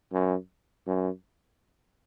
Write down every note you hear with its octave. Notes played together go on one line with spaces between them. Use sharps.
F#2
F#2